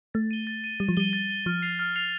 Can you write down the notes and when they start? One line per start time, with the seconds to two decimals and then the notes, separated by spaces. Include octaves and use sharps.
0.14 A3 A6
0.31 D#7 G7
0.47 A6
0.64 D#7 G7
0.80 G3 A6
0.89 F3
0.97 G3 D#7 G7
1.13 A6
1.29 D#7 G7
1.46 F3 F6
1.62 A6 C7 F7
1.79 F6
1.96 A6 C7 F7